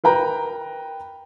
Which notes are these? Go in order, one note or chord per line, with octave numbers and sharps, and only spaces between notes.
A#4 B4 G5 A#5